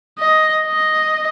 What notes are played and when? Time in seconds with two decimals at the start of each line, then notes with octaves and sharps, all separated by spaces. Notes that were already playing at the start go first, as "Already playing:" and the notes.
0.19 D#5
0.67 D#5